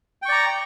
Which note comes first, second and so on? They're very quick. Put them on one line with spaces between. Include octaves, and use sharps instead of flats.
G5 C#6 D5 A#5